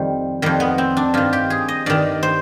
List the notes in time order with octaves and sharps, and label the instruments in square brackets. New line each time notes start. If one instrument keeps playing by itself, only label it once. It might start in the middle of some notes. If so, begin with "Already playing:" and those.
Already playing: [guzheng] F2 D#3 G3
F2 D#3 G3
B3
C4
D4
G2 D#3 F4
G4
G#4
D#5
G2 D#3 D5
C5